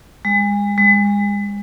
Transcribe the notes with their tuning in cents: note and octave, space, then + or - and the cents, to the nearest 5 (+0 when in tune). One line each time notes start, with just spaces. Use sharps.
G#3 -30
G#3 -30